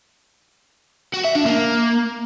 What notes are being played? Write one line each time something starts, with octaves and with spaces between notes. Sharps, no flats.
F#4
E5
D4
A#3